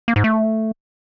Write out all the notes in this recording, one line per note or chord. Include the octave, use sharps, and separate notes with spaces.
A#3
G#2
A3